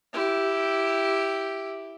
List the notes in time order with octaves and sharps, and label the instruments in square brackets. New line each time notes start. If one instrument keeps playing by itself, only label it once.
[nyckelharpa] E4 G4